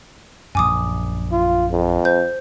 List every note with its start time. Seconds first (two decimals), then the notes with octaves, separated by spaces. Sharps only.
0.55 A#1 F#2 G#5 D6 D#6
1.32 F4
1.71 F2
2.05 C5 G6